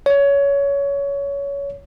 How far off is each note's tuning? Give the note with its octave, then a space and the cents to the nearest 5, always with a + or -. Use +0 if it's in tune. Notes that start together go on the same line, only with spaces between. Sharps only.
C#5 +20